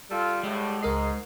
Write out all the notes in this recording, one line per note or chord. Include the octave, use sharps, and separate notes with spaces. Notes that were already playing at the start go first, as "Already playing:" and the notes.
G3 F4 A4
A2 D3 G#3
C#2 G#2 A#4 D#5 C7